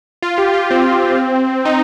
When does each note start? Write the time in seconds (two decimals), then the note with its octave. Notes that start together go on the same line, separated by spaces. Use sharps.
0.23 F4
0.38 G4
0.54 F4
0.71 C4
1.65 D#4